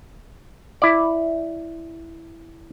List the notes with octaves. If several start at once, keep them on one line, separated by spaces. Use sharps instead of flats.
E4 D5